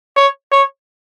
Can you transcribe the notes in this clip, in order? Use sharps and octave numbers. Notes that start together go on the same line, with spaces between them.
C#5
C#5